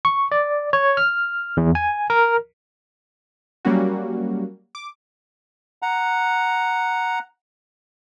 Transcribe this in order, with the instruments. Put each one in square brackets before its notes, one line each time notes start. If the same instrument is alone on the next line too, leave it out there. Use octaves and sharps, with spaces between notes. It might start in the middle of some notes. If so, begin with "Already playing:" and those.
[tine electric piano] C#6
D5
C#5
F6
E2
G#5
A#4
[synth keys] F#3 G3 A#3 C#4 F#4
D6
[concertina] F#5 A#5